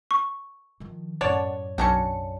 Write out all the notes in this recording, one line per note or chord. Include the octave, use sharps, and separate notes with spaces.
C#6
D#3 F3
F#2 A2 C#5 D5 F#5 A5
B1 C#4 D4 F#4 C#7